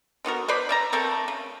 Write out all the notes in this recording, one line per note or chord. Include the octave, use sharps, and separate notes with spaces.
D3 B3 F#4 A#4
B4 C5 D5 B5
D5 E5 A#5
A3 C4 A4 A#4
C#3